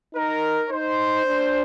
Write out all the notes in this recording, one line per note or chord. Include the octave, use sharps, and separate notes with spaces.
D#4 A#4
D#4 C5
D4